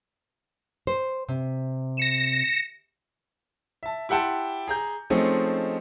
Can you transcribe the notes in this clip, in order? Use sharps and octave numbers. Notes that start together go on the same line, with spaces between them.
C5
C3
A#6 C#7 E7
E5 A5
E4 G4 F#5 G5 A5 C6
G#4 A#5 G6
F3 G#3 A3 C4 C#4 D#4